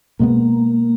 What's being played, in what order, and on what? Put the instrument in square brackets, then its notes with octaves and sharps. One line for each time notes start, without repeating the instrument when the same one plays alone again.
[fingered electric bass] B2 G#3 B3 [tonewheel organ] A#3